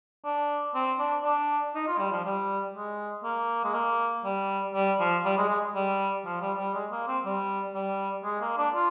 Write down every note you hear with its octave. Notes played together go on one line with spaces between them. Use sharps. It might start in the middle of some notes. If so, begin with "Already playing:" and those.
D4
C4
D4
D4
D#4
F4
G3
F3
G3
G#3
A#3
G#3
A#3
G3
G3
F3
G3
G#3
G#3
G3
F3
G3
G3
G#3
A#3
C4
G3
G3
G#3
A#3
D4
F4